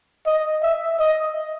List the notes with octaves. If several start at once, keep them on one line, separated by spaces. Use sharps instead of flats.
D#5
E5
D#5